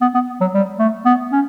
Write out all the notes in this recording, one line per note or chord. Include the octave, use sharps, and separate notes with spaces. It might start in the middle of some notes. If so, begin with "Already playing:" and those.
B3
B3
F#3
G3
A3
B3
C#4